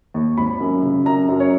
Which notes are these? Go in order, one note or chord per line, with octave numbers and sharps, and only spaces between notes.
D#2
G#1 B5
F#2
C#3
F#2 A#5
F#2
C#5